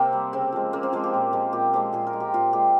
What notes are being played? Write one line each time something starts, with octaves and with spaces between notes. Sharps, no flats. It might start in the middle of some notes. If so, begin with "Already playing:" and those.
Already playing: C3 A#3 C4 G4 A#4
G3
C#3 C4
F3 G#3
C#3 A#3
C4
F3 G#3 G#4
G4
A#2
F3 G#3
A#2 G4
F3 G#3 G4
A#2 G#4
A#4
G#3
G4
A#2 F4
G#3 G4